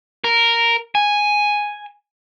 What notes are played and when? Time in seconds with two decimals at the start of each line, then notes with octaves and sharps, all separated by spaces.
0.24 A#4
0.95 G#5